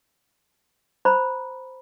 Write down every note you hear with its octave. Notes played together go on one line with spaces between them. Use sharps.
C5 A#5 B5